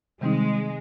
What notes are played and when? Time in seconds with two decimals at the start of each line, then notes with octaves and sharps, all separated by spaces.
0.21 C3 D#3 G3 G#3 C4 D#4